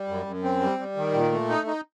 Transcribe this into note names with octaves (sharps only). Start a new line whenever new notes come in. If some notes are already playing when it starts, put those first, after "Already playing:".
Already playing: G3
F#2
F#2
C4
G3
G3
D#3
A#2
A3
D#4
D#4